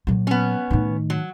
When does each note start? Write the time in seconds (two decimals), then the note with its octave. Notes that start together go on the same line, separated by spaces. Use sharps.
0.07 A#2 F#3
0.27 B3 C#4
0.71 A2 D#3
1.10 F#3